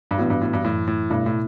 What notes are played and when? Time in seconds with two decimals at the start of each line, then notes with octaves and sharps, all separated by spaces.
0.11 G2
0.18 A2 E3 B3 D4 F#4
0.30 G2
0.41 A2
0.53 G2
0.64 F#2 A2 E3 A3
0.88 A2
1.10 G2 B2 A3 E4
1.26 A2